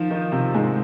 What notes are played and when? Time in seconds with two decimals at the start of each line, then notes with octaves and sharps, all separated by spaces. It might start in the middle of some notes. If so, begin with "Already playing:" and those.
Already playing: D#3 F3 D#4 F4
0.10 D#3 D#4
0.32 C3 C4
0.54 G#2 G#3